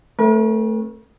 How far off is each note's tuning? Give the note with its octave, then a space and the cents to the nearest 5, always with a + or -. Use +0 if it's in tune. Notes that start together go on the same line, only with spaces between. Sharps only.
A3 +0 C4 +30 A#4 +45